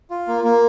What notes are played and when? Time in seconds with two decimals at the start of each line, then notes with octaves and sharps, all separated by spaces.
0.10 F4
0.28 A#3
0.44 A#3